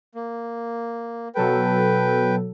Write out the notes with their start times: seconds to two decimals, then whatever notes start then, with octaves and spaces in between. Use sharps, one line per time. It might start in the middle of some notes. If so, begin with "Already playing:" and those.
0.15 A#3
1.35 B2 F#3 A4 B4 G5